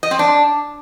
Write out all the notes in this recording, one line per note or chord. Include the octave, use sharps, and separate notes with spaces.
D#5
C4
D4